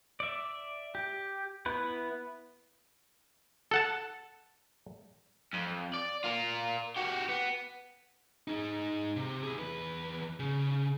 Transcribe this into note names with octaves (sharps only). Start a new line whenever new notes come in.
D5 E5
G4
B3 E4 B4
A4 F#5 A5
F2
D5
F4 A#4
F#4 G4
B3
D#4 G#4
C3
E4 G#4
E2 B4
C#3